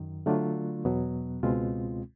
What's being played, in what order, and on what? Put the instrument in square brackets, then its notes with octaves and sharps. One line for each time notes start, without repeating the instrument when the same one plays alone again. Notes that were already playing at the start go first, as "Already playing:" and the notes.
Already playing: [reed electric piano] F#2 D#3
D3 F#3 A3 D4 F4
E2 B2 F#3 B3
C#2 B2 G#3 C4 F4